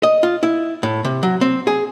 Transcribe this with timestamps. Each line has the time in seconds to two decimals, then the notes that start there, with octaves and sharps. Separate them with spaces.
0.03 D#5
0.23 F4
0.43 E4
0.83 A2
1.05 C3
1.23 F#3
1.41 C4
1.67 G#4